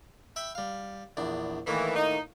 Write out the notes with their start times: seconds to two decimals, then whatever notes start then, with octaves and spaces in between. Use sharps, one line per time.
0.36 E5 G5 B5
0.55 G3 F5
1.17 A#1 E2 D4
1.67 A2 D#3 E3 A#3
1.95 D#4